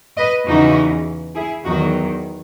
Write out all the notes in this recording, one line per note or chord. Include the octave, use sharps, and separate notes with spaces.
B4 D#5
E2 C#3 E3 D#4 F#4
E4 G#4
E2 D#3 F#3 D#4 F#4